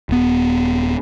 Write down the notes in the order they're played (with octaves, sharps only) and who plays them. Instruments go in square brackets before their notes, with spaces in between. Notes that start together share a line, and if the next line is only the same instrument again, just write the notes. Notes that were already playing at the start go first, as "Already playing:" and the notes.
[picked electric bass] D#1 B3